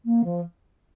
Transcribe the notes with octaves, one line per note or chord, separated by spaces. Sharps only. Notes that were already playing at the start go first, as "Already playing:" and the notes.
A#3
F3